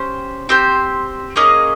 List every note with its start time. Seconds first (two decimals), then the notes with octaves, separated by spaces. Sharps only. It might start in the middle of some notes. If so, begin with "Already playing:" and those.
Already playing: C#4 G4 C5
0.49 C4 G4 C5
1.36 A#3 C#4 G#4 D#5